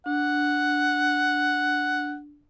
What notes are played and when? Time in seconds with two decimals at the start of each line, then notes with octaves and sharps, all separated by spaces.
0.06 D4 F#5